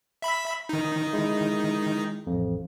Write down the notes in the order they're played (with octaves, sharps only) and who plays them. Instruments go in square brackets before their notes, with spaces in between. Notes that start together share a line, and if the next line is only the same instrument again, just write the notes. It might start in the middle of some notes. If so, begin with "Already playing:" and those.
[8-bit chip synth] E5 B5 B6
D#3 D#4
[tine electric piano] G#3 E4
A1 F2